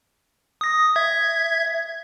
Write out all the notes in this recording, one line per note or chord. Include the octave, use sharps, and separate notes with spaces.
D#6 A#6
E5 G#6